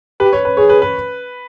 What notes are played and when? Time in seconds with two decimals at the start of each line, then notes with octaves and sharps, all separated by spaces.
0.20 G4 B4
0.33 C#5
0.45 B4
0.57 G#4 C#5
0.69 B4
0.82 B4